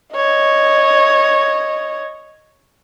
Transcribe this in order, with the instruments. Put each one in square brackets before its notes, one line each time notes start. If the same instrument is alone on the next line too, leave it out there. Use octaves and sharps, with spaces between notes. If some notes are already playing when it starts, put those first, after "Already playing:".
[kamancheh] C#5 D#5